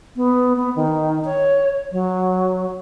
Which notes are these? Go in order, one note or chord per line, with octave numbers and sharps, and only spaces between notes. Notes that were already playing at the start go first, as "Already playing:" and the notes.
B3
B3
D#3
C#5
F#3